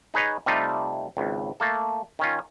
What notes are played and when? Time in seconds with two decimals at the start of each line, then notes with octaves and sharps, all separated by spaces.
0.14 D#4 G#4 B4 C#5 D#5
0.46 C3 G3 A3 D#4 F4
1.17 G#1 C#2
1.60 A3 A#3 A4
2.19 D#3 C#4 F4